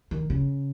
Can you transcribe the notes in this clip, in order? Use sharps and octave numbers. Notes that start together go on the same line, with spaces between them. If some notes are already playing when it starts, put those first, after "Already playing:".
D#3
C#3